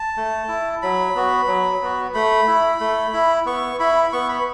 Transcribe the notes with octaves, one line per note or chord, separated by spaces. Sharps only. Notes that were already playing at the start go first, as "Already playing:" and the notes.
Already playing: A5
A3
E4
F#3 B5
B3 F#4
F#3
B3 F#4
A3 B5
E4
A3
E4
B3 C#6
E4 B5
B5
B3 C#6
B5